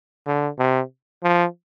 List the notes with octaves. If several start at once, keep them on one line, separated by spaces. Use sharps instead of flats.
D3
C3
F3